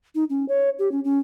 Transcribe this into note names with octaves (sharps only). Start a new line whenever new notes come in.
D#4
C#4
C#5
G4
C#4
C#4